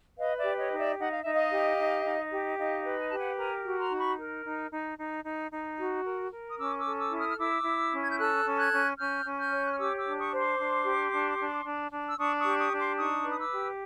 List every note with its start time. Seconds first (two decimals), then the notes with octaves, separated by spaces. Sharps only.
0.17 B4 D#5 F5
0.37 D5 E5
0.44 G4
0.58 C#5 D#5
0.71 D#4
0.77 D5 E5
0.98 D#4 F#5
1.09 F5
1.22 D#4 E5
1.33 D#5 F5
1.51 G4
1.77 D#4
2.05 D#4
2.31 G4
2.57 D#4 D#5 F5
2.85 B4
2.98 G#5
3.08 G4 A5
3.17 F#5 G#5
3.38 A#4 G#5 A#5
3.65 F#4
3.78 A#5 C6
3.92 D#4
3.98 B5 C#6
4.18 A#4
4.45 D#4
4.71 D#4
4.98 D#4
5.25 D#4
5.51 D#4
5.78 F#4
6.05 A#4
6.31 A#4
6.49 D#6
6.58 C#4 D6 E6
6.78 D6 E6
6.85 A4
6.98 D6 E6
7.11 E4
7.18 D#6 F6
7.30 F6
7.38 E4 D6 E6
7.65 E4
7.92 C#4
8.01 G#6
8.10 G6
8.18 A4 E6 F#6
8.44 C#4
8.58 F#6 G#6
8.71 C#4
8.98 C#4 F6 G6
9.25 C#4
9.38 F6 G6
9.52 C#5
9.64 F#6
9.71 F6
9.78 G4 D6 E6
9.98 D6 E6
10.06 D4
10.18 C#6 D#6
10.32 C5
10.38 C6 D6
10.58 D4
10.85 G4
11.12 D4
11.39 D4
11.65 D4
11.92 D4
12.09 E6
12.18 D4 C#6 D#6
12.38 C#6 D#6
12.45 G4
12.59 C#6 D#6
12.72 D4
12.78 C6 D6
12.98 D#4 C#6 D#6
13.25 B4 D#6
13.38 D6 E6
13.52 G4